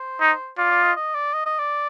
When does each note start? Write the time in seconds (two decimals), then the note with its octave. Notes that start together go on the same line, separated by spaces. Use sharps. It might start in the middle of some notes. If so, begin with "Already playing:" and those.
Already playing: C5
0.20 D#4
0.58 F4 D5
0.71 D5
0.83 D#5
0.96 D#5
1.15 D5
1.33 D#5
1.46 D#5
1.59 D5